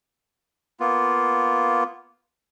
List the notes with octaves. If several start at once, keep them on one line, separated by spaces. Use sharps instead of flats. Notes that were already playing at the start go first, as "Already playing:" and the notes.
A#3 B3 F4